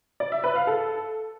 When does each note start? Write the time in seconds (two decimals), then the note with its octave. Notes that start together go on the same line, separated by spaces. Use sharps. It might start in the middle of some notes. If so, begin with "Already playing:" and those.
0.20 D5
0.32 E5
0.44 B4
0.55 F5
0.67 A4